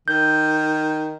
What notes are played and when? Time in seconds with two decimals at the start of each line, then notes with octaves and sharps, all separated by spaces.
0.08 D#3 G6